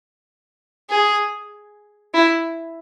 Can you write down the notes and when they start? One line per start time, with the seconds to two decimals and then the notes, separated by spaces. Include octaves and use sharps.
0.90 G#4
2.14 E4